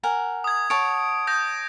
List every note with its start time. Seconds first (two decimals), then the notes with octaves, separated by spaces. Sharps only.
0.03 A#4 F#5 G#5
0.44 D#6 G#6
0.70 C#5 F#5 A5 D7
1.27 D#6 G6 A#6